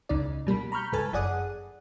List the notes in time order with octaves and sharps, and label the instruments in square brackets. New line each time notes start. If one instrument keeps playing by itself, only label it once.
[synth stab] C#2 C#3 D#4 D5
B2 G3 A#3 B5
A#5 B5 C#6 F6 G6
C#2 G#2 A4 B4 G#5 A5
G1 F#2 G#4 D5 F#5 D#6